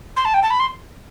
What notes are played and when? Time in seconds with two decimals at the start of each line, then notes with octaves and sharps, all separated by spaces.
0.17 C6
0.25 A5
0.34 G5
0.43 A5
0.50 B5
0.60 C6